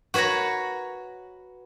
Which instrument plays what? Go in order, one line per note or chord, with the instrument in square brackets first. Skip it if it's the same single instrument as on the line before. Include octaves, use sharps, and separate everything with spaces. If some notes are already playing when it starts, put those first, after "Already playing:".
[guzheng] F#4 B4 C#5 F#5 A#5